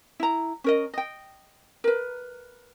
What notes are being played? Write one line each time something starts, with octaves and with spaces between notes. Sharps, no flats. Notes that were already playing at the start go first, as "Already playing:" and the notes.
E4 A#5
C#4 A#4 D#5
D#5 G5
A#4 B4